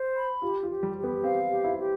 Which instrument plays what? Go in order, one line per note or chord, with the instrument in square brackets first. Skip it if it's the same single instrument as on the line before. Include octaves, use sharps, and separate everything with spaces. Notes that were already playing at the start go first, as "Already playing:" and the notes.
Already playing: [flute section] C5
B5
[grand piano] F4 [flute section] G4
[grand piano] F4
[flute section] G4
[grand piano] G3
[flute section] G4
[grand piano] B3
[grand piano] C4 [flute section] F5
[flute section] G4
[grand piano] E4
[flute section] G4